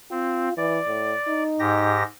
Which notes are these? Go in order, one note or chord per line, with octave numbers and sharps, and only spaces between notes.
C4 F4
E3 D5
A2
D#4
G#2 G4 A#6